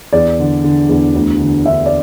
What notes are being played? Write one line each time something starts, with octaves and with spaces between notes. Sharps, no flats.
E2 D5
D3
D3
E2
D2
D3
D3 E5
D5